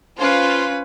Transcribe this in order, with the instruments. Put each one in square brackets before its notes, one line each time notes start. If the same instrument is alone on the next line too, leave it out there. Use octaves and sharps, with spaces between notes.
[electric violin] C#4 B4 [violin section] F4 C5